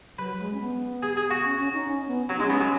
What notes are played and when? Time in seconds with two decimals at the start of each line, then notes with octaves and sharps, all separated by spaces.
0.18 F#3 B4
0.39 G#3
0.53 C#4
0.61 B3
1.03 G#4
1.17 G#4
1.30 F#4
1.45 C#4
1.59 C#4
1.73 D#4
1.87 C#4
2.08 B3
2.29 F#3 C#4
2.37 D#4
2.40 G#3
2.44 C#4
2.50 B3
2.60 F#3